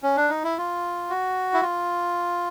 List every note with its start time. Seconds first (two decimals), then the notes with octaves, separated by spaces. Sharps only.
0.03 C#4
0.17 D4
0.29 D#4
0.44 E4
0.58 F4
1.10 F#4
1.54 E4
1.62 F4